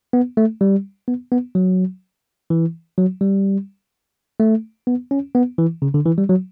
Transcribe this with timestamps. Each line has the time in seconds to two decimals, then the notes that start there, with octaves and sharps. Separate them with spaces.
0.13 B3
0.37 A3
0.61 G3
1.08 B3
1.32 B3
1.55 F#3
2.50 E3
2.98 F#3
3.21 G3
4.40 A3
4.87 B3
5.11 C#4
5.35 B3
5.58 E3
5.82 C#3
5.94 D3
6.06 E3
6.18 G3
6.29 F#3